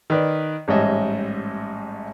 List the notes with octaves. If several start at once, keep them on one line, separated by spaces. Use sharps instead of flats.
D#3 B4 D5
A1 G#2 G3 C#5 D#5 E5